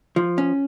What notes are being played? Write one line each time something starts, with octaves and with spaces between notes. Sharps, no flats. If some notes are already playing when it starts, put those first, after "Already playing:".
F3
C#4